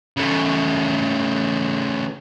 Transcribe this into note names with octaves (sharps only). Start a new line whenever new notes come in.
C#3 A3